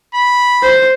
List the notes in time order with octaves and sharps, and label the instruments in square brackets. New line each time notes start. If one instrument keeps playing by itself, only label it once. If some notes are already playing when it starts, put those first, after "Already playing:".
[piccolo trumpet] B5
[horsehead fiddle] C5